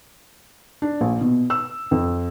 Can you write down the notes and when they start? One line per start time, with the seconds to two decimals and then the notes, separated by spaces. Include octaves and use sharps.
0.82 D4
1.01 A#1
1.21 B2
1.50 E6
1.91 F2